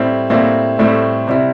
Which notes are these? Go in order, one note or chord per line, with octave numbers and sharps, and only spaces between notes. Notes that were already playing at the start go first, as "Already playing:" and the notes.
Already playing: A2 G3 C4 E4
A2 G3 A#3 C4 E4
A2 G3 A3 C4 E4
C3 G3 C4 E4